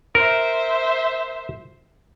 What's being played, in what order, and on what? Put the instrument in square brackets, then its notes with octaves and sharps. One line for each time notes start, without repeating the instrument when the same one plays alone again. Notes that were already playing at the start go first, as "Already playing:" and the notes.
[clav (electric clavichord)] A#4 [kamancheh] C5 E5